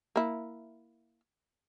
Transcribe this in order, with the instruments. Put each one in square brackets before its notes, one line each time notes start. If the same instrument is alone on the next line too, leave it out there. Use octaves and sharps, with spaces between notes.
[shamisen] A#3 E4